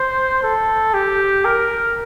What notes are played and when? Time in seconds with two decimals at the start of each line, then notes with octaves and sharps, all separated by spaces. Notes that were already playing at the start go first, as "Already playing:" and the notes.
Already playing: C5
0.43 A4
0.94 G4
1.45 A#4